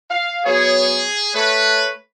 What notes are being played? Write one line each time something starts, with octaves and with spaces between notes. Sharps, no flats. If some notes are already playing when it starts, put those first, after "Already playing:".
F5
F#3 B3 G#4 C#5
A3 B4 C#5